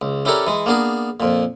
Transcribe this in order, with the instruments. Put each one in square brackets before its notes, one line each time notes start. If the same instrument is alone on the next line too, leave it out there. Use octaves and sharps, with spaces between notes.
[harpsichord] C#2
C#4 E4 G4 A4 A#4 D5
E3 G#3
A#3 B3 D4 G#4 A#4
F2 A#2